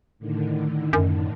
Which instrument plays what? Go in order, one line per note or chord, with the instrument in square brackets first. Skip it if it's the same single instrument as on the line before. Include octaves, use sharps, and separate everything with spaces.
[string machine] A2 D3 D#3
[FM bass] F#2